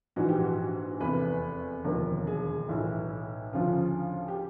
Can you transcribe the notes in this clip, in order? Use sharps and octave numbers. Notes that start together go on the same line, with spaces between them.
A#1 G#2 E3 F#4
G4
F#4
F1 E2 C3 B4
E1 D#2 D3 F3 A#4
G#4
B1 A2 E3 E4
D2 C#3 F3 F4
G4